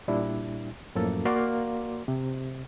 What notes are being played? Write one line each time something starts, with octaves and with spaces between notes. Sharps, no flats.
A#2 G3 D4 E4
F#2 A2 F3 A#3 A4
A#3 F#4 D5 F5 C6
C3